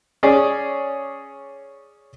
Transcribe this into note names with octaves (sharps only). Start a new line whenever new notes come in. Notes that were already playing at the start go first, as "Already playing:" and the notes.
C#4 G#4 D5